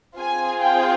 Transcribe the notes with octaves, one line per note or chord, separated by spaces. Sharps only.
C4 F4 G#4 G#5
G5